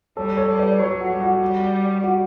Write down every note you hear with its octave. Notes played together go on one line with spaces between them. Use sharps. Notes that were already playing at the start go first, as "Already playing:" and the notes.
G3 A4 C#5
A4 C#5
G3
B4 D5
F#3 A4 C#5
F#4
G3
F#4
G3
F#4